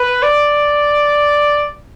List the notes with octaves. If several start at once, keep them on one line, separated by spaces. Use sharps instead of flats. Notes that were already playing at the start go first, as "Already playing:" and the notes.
Already playing: B4
D5